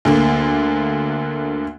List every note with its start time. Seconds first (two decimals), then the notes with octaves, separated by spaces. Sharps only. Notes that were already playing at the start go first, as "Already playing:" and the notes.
0.05 D2 D3 A#3